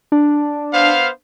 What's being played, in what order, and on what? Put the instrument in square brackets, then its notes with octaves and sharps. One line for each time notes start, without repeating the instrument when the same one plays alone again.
[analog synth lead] D4
[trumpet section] B3 C5 F5